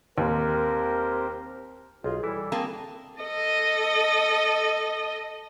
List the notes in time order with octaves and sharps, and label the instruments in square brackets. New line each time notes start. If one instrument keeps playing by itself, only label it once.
[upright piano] D#2 [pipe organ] C4 G4 C5 [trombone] A#4
[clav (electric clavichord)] B1 [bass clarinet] F4 [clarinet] G#4
[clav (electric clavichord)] E3 E4 [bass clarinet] G3 [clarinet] A4
[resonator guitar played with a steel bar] A#3 G#4 A5 [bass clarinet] C4
[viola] A4 D#5